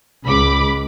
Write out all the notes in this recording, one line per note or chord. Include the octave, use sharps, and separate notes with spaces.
C#2 B5 D6